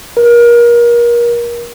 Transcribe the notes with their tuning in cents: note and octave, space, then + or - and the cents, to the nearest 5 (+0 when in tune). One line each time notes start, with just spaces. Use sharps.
A#4 +30